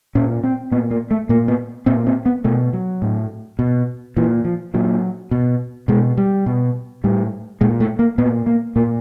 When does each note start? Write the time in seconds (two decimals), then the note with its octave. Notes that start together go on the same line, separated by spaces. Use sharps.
0.15 A#2 C#4
0.44 C4
0.71 A#2 B3
0.91 A#3
1.11 A3
1.29 A#2 A#3
1.48 B3
1.86 A#2 C4
2.07 C4
2.26 B3
2.44 B2 A3
2.73 F#3
3.02 A2
3.59 B2
4.17 A#2 E3
4.45 F3
4.74 A#2 F#3
5.31 B2
5.88 B2 G#3
6.17 G3
6.46 B2
7.04 A2 G3
7.61 A#2 G#3
7.80 A3
7.99 A#3
8.18 A#2 B3
8.46 A#3
8.76 A#2 A#3